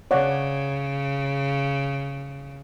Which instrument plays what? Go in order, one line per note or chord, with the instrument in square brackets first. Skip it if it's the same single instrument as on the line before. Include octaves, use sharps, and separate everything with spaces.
[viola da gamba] C#3 [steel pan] C#5 D5 F#5